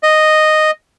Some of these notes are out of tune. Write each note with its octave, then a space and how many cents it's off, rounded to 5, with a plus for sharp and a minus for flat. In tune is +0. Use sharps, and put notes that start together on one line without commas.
D#5 -5